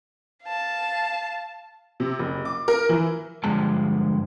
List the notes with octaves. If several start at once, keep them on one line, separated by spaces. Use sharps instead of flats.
F5 A5
C3
F#1
D6
A#4
E3
G2 D3 F3 G#3 A5